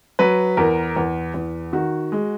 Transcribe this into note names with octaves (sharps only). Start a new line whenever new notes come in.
F#3 B4
E2 A#4
E2
E2
D#3 F#4
G#3